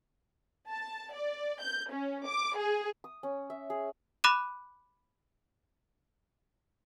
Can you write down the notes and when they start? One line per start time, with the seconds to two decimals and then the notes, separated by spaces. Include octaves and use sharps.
0.70 A5
1.14 D5
1.62 G6
1.91 C#4
2.28 D6
2.57 G#4
3.04 D#6
3.23 C#4
3.50 E5
3.70 G#4
4.24 B5 D6 F#6 D#7 E7